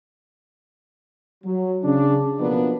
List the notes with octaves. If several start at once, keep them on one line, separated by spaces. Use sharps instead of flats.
F#3
C#3 D4
B2 F3 F#3 A#3 B3 D4